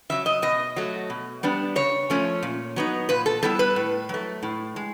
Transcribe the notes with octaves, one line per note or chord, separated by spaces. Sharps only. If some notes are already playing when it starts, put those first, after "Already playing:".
C#3 F#3 E5
D#5
B2 D#5
F#3 A3
B2
G3 B3 D4
C#3 C#5
F3 A3 C#4
A#2
F#3 B3 D#4
A#2 B4
A4
G3 B3 E4 A4
B4
A2
F#3 A3
A2
G#3